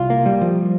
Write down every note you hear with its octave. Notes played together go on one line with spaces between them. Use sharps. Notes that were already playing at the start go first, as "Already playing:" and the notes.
Already playing: C2 F4
A#3
G3
F3